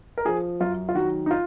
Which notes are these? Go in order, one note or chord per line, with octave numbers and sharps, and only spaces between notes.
A#4
F3 G#4
F#2 F4
F4
D#3 F#3 F#4
D#4
F4